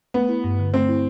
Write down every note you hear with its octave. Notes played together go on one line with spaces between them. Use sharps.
A3 B3
E4
G2
D3
A3 C4
E4